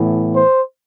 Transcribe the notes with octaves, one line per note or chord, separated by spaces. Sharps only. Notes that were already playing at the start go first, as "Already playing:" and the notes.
Already playing: A2 E3 B3
C5